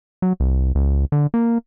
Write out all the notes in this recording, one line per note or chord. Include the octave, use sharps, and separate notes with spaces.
F#3
C2
C#2
D3
A#3